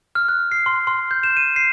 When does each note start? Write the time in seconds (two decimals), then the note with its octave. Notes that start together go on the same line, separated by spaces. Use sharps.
0.15 F6
0.29 F#6
0.52 C7
0.66 C6
0.87 C6
1.11 G6
1.23 E7
1.37 D#7
1.56 C7